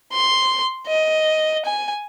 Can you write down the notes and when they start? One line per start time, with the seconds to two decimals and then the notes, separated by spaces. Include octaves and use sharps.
0.12 C6
0.87 D#5
1.65 G#5